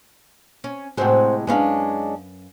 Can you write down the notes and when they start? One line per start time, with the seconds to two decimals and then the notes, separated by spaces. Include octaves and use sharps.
0.64 C#4
0.97 A2 C3 G#3 C4 F#4 C5
1.47 F#2 G#3 C#4 D4 B4 F5